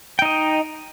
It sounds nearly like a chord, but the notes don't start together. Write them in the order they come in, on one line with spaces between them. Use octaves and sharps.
G5 D#4 D#5